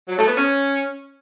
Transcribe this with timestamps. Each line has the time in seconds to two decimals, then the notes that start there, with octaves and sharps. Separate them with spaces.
0.09 F#3
0.18 A3
0.27 B3
0.37 C#4